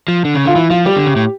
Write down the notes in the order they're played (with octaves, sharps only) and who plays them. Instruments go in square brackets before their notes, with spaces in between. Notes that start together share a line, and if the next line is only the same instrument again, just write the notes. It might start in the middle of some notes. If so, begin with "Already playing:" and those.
[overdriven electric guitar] F3
D3
C#3
[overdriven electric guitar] D3 [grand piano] F4
[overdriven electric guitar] E3 [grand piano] E4
[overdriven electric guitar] F3 [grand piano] F4
[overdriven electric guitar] G3 [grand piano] G4
[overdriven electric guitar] D3
C#3
A2